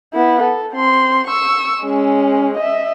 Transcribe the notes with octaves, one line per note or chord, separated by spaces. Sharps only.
B3 E4
A4
C4 C6
C#6 E6
G#3 C#4
D#5 E5